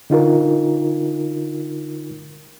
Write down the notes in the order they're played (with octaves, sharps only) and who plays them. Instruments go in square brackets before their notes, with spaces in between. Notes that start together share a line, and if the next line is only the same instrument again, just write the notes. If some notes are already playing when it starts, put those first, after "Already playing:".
[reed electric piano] D3 D#4 F4 A#4